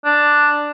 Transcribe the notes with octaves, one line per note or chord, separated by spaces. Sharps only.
D4